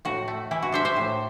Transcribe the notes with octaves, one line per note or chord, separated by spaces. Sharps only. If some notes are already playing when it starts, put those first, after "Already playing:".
A2 F#4
A3
E3 E4
F#4
D4 C5 E5
C5 E5
A2